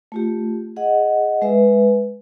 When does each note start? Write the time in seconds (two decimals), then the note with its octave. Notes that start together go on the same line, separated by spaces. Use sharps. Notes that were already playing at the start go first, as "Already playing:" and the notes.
0.12 A3 F4 G4
0.76 G#4 D#5 F#5
1.42 G#3 B4 E5